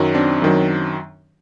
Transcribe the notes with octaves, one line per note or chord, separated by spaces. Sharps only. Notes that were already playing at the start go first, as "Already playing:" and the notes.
Already playing: F#2 D#3 F#3
C4 D4
F#2 D#3 F#3